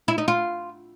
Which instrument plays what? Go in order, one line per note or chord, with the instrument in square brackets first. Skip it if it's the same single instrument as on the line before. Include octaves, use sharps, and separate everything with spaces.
[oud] E4
D#4
F4